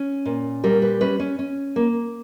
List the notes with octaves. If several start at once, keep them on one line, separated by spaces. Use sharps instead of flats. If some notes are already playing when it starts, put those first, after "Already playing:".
Already playing: C#4
A#2
G3 A#4
B4
C#4 B4
C#4
C#4
A#3